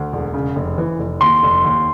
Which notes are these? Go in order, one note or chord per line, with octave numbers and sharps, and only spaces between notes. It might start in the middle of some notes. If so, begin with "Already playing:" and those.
Already playing: D2
E1
C#3
F1
E3
F1
D#2 C6
F1
D#2